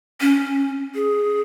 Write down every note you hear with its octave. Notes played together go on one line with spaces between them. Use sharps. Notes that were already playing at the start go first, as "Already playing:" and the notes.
C#4
G#4